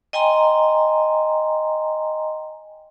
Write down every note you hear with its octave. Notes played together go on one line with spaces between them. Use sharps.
D#5 G5 G#5 A#5 C6